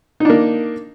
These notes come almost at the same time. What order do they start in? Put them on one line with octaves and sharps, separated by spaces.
D#4 D4 A#3